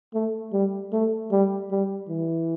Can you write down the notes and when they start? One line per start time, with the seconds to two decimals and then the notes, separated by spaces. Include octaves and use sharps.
0.14 A3
0.53 G3
0.93 A3
1.32 G3
1.71 G3
2.10 E3